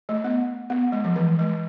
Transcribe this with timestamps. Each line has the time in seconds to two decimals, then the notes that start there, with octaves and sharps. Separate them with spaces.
0.09 A3
0.24 B3
0.70 B3
0.92 G#3
1.04 F3
1.16 E3
1.39 G#3